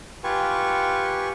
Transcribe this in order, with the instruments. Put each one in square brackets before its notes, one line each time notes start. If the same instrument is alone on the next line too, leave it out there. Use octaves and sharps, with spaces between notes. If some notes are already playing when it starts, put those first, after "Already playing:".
[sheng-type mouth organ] F4 G4 B4 G#5 C#6